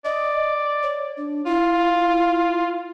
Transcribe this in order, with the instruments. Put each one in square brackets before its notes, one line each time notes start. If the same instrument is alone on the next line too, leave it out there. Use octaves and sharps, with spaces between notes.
[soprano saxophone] D5 [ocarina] D#5
[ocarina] C#5
D4
[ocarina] E4 [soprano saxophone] F4